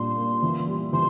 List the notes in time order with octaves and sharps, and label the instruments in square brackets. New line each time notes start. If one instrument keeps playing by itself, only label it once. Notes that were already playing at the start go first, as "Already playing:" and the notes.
Already playing: [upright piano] A#2 G3 D4 [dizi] C6
[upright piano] A#3
E3
G3
[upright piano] E3 [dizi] C6